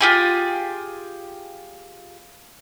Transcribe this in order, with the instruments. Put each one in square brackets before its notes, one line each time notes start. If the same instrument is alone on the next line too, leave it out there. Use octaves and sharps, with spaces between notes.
[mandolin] F4 G4 G#4